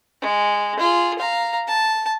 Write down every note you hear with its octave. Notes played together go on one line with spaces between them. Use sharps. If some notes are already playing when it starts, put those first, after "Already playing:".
G#3
F4 G#4
F5 A#5
A5